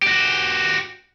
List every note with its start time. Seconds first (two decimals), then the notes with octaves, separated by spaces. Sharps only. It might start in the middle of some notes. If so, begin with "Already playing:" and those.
0.02 F#4 G4